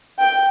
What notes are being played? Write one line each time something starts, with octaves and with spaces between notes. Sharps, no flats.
G5